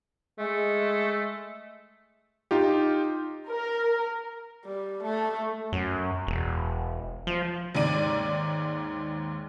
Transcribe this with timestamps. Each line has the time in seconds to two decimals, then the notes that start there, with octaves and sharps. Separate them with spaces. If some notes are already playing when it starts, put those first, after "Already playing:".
0.39 G#3 A3
2.51 D#4 F4 G4
3.48 A#4
4.65 G3
5.03 A3
5.72 F#2
6.27 E1
7.27 F3
7.75 D#2 G#2 D5 D#7